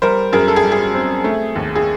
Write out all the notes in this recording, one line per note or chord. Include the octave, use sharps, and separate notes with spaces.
G3 A#4 C5
F#2 G#4 A#4
A4
G#4
G3
G#4
C4
A3
D#2
G#4